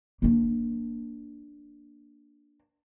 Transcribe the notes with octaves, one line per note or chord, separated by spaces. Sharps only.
A#3 D4